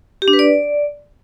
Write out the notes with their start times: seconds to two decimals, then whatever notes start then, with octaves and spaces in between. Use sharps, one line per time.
0.22 G4
0.28 D4
0.33 B4
0.39 D5